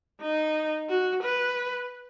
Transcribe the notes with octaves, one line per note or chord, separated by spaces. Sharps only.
D#4
F#4
B4